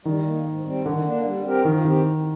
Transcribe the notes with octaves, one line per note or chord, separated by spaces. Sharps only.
D#3 G3
A#3 D#4
G#2
G3 C4
D3 D#3
A#3 D4
G3
C4 G4 A#4
D#3 F3
D#3 C4 G4